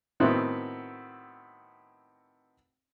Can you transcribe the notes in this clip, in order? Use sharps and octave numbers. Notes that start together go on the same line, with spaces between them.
A2 D#3 B3 C4 E4 F#4